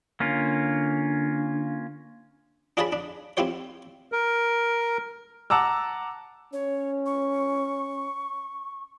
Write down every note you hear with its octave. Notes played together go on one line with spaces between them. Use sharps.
D3 A#3 C#4 F4
D4 F4 G#4 C#5 A5 B5
D4
C4 E4 F4 G4 C5 C#5
A#4
F#5 A5 A#5 D6 E6
C#4 C#5
C#6